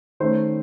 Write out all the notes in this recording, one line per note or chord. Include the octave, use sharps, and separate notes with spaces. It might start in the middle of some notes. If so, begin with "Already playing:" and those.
D#3 A3 C#4 C5